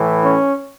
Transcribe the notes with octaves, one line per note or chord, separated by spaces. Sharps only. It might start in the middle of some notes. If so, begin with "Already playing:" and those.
Already playing: A2 E3
C#4